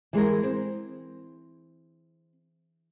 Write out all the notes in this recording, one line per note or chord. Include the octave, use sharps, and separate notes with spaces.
E3 G#3 G#4 A#4
C4